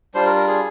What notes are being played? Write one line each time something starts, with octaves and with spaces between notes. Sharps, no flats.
G3 D4 F4 C5
A#4
A#4
G#4